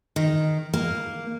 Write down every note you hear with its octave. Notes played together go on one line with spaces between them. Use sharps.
D#3
A#3